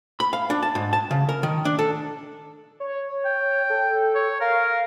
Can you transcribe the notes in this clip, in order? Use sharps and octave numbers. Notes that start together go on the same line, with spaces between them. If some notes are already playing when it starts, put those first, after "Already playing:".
B5
F5
D4
A5
G#2
A5
C#3
A#4
D#3
D4
A4
C#5
G5
A4
C#5
A#4 F5